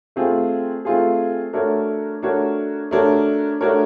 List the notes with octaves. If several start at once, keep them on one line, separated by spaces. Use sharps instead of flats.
A3 C4 F4 G#4
A3 C4 F4 G#4
A3 D4 F#4 A#4 C#5
A3 D4 F#4 A#4 C#5
A3 D4 F#4 A#4 C#5
A3 D4 F#4 A#4 C#5